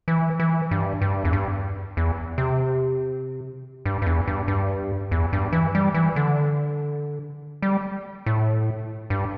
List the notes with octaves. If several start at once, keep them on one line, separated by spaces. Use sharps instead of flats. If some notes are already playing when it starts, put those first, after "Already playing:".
E3
E3
G2
G2
E2
G2
E2
C3
G2
G2
E2
G2
G2
E2
G2
E3
G3
E3
D3
G3
A2
G2